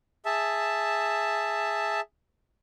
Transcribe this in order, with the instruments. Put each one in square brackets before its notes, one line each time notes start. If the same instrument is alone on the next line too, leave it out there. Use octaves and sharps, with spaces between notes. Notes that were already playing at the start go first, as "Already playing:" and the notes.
[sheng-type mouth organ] G#4 E5 A5